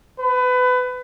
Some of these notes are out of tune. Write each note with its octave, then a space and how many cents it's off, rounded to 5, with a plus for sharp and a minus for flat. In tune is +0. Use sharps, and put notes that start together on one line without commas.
B4 +25